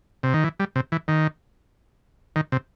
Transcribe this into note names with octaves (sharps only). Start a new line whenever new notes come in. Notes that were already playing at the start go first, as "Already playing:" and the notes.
C3
D#3
E3
G3
C3
E3
D#3
D#3
C3